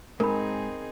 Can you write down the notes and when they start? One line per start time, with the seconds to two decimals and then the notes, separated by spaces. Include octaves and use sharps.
0.20 G#2 C4 D#4 G#4 A#4 B5